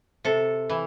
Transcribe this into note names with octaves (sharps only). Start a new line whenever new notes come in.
C3 A4
E3